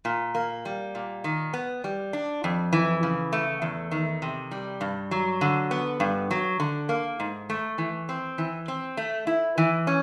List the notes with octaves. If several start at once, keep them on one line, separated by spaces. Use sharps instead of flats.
A#2
A#3
G3
A#2
D#3
B3
G3
D4
F2
E3
C#3
A3
E2
D#3
C3
G3
G2
F#3
D3
B3
G2
F#3
D3
A#3
G#2
A3
E3
C4
E3
C4
A3
E4
E3
C#4